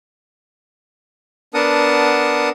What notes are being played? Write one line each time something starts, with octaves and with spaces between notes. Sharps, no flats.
B3 D4 A#4 F#5 A5 D#6